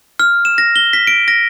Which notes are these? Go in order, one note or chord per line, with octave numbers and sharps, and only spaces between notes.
F6
E7
A#6
G7
B6
D7
A#6